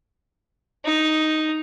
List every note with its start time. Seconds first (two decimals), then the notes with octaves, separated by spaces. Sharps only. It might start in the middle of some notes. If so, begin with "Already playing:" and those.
0.84 D#4